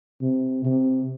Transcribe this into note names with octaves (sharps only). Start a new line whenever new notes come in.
C3
C3